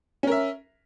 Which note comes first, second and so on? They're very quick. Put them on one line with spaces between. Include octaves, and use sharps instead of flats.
C#4 A#4 E5